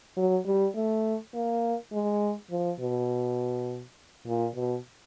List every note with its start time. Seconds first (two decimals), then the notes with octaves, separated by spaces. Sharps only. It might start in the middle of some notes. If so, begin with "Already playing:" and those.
0.17 F#3
0.46 G3
0.75 A3
1.33 A#3
1.92 G#3
2.51 F3
2.80 B2
4.27 A#2
4.56 B2